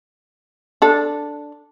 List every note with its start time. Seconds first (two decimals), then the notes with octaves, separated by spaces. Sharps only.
0.82 D4 A4